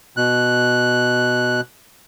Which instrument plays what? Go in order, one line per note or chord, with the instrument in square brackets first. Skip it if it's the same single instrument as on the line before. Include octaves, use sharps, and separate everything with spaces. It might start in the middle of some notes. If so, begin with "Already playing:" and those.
[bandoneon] B2 F#6